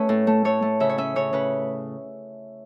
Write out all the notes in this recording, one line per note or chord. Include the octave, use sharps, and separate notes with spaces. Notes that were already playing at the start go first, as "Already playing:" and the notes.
Already playing: A3 C#4 B4 C#5 E5
A2
A3
A3 C#5
A3
C#3 E5
C#5
C#4 E5
C#3 C#5
C#3 B4